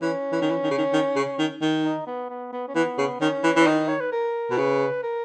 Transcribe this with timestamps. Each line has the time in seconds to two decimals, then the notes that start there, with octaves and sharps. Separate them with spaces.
0.02 E3 C#4
0.32 E3
0.42 D#3
0.51 E3
0.63 D#3
0.71 C#3
0.78 D#3
0.93 D#3
1.16 C#3
1.39 D#3
1.61 D#3
1.84 D#4
2.07 B3
2.30 B3
2.53 B3
2.68 C#4
2.75 E3 B3
2.98 C#3
3.21 D#3 C#4
3.44 E3
3.56 E3 C#4
3.67 D#3 D#4
3.88 C#5
4.01 B4
4.12 A#4
4.50 B2
4.58 C#3 B4
5.03 A#4